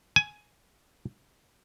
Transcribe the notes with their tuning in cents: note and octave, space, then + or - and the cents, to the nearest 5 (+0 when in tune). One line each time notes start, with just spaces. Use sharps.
G#5 +10